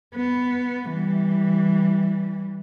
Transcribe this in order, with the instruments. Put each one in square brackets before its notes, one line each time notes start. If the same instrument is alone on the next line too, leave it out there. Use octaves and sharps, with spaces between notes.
[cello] B3
E3 G3